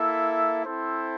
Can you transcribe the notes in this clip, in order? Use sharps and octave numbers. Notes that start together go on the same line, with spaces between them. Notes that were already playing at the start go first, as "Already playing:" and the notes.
Already playing: A#3 E4 A4 E5
C4 E4 A4 C5